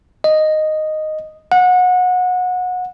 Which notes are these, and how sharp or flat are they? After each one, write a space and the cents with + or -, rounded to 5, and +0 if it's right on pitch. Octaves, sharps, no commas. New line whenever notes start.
D#5 -5
F#5 -25